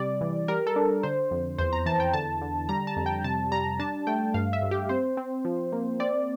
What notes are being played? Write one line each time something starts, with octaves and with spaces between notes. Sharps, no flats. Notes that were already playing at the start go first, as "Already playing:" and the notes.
Already playing: C3 G3 D5
E3
G3 A#4
A4
D4
D3 C5
F2
E2 C5
A#5
E3 A5
G5
D3 A5
D3
G3 A#5
A5
F2
G5
C3 A5
G3 A#5
D4 A5
A3 G5
G2 F5
E5
G2
G4
C4 C5
C4
F3
A#3
C4 D5